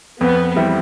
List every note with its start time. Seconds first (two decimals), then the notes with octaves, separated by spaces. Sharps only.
0.20 F2 B3
0.56 E3 G3 C4 E4